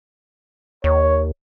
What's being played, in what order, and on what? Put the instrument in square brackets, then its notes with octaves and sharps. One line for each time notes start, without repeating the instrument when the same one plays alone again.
[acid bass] D#2 [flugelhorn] C#5